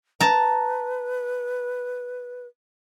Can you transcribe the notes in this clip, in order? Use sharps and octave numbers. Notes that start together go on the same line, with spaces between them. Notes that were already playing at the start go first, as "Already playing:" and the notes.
B4 A5 A#5